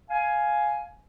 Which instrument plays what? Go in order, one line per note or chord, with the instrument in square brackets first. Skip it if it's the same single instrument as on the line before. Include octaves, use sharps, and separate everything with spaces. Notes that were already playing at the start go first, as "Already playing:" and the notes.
[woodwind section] F5 G#5